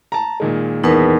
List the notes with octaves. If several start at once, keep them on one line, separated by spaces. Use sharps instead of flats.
A5 A#5
A#2 D#3 G#3
E2 D#4 A#4 B4